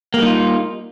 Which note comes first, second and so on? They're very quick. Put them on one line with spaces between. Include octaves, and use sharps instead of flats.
A#3 G3 D#4 F4